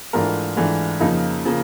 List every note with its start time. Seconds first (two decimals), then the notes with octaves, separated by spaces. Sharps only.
0.13 G#2 E3 A3 D4 F4 A#4
0.57 G#2 E3 A3 D4 F4
1.00 F2 C#3 F3 A#3 D#4
1.45 C#3 F3 A#3